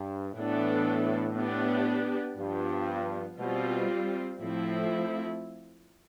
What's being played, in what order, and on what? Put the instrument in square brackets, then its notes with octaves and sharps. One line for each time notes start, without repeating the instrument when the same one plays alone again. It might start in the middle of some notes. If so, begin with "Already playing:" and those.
Already playing: [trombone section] G2
[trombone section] A2 [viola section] E3 B3 D4 A4
[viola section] B3 D4 G4
[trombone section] G2 [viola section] F3 B3 F4
[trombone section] B2 [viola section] G3 C4 F4
[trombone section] A2 [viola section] F3 A3 C4 E4